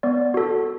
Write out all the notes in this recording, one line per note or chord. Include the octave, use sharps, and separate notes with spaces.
B3 D5
F#4 A4